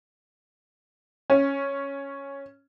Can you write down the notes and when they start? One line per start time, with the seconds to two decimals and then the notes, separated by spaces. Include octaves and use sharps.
1.30 C#4